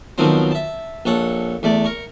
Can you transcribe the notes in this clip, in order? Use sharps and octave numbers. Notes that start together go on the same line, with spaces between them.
B2 D#3 F3 F#3 C4
E5 A5
A#1 A4 C#5 F#5
E2 A3 D5
A#4 C#6